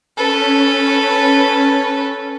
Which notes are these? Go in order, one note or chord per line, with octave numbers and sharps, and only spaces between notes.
C#4 A4 B4